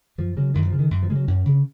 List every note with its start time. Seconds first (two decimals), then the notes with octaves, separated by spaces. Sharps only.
0.18 F#2 F3
0.37 C#3 F#3
0.54 F#2 D#3
0.67 F3
0.72 C#3
0.79 D#3
0.91 F#2
1.03 F3
1.10 C#3 G#3
1.15 F#3
1.28 F#2 C#4
1.46 C#3